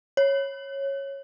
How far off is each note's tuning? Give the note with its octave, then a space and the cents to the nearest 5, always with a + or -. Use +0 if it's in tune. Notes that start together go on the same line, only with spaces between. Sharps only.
C#5 -10